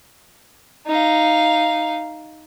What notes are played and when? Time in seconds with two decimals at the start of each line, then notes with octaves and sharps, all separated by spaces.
0.87 D#4 F5